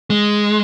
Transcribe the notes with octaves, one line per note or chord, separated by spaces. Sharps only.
G#3